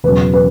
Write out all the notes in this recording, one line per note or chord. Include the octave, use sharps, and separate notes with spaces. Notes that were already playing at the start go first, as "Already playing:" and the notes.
E1 E2 C#3 F#3 B4
B4